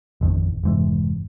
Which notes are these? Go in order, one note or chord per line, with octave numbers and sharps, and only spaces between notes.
A1 F2 D#3
F1 G#2 E3